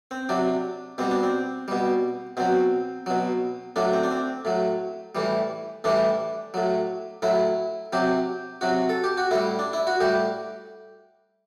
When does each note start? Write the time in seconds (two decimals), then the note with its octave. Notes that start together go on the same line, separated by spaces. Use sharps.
0.11 C4
0.29 C3 F#3 D4
0.98 B2 G3 C4
1.11 D4
1.23 C4
1.68 B2 G3
2.37 B2 F#3 C4
3.06 B2 F#3
3.76 A2 F#3 D4
3.93 C4
4.03 D4
4.11 C4
4.45 A2 F#3
5.15 A2 E3 G3
5.84 A2 E3 G3 D4
6.54 A2 F#3
7.22 A2 F#3 E4
7.93 C3 F#3 G4
8.61 C3 F#3 F#4
8.89 A4
9.04 G4
9.17 F#4
9.31 A2 G3 E4
9.59 D4
9.73 E4
9.87 F#4
10.00 A2 G3 G4